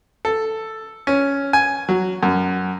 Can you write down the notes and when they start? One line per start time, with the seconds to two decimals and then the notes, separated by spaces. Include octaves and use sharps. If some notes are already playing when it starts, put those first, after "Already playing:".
0.25 A4
1.07 C#4
1.53 G#5
1.89 F#3
2.23 F#2